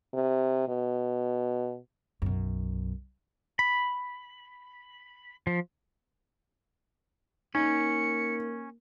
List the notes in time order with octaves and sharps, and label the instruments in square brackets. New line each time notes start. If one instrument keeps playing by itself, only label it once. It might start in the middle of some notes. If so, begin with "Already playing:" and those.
[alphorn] C3
B2
[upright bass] B1 F#2
[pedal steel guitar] B5
F3
[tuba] A#3 [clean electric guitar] C#4 [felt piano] D#4 [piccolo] C#7